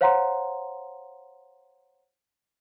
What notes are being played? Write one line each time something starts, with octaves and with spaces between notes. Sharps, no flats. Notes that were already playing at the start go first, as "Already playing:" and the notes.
C5 C#5 F5 F#5 A#5 C6